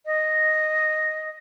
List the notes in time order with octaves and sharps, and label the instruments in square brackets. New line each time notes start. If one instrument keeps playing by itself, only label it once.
[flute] D#5